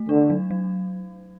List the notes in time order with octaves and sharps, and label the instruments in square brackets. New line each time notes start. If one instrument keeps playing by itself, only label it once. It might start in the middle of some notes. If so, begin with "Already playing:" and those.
Already playing: [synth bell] A3
[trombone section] D3 [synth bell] D4
[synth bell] F#3
F#3